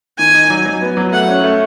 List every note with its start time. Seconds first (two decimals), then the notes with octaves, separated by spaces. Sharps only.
0.18 D#3 G#5
0.34 D#4
0.50 F#3
0.65 F#3
0.81 B3
0.97 F#3
1.12 A3 F#5
1.28 C#4
1.44 A3